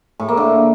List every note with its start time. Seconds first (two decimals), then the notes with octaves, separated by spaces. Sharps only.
0.20 A2
0.28 A#3
0.37 D3